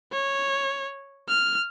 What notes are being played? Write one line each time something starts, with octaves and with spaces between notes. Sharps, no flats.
C#5
F6